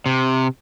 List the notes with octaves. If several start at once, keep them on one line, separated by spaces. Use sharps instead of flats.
C3